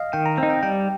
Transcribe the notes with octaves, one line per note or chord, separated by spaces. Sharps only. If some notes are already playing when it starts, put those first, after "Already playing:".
Already playing: D#5 F5
D#3 G5
A#5
C4 A#5
D#4
G5
G3 G5